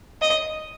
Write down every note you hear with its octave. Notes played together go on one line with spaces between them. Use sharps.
D#5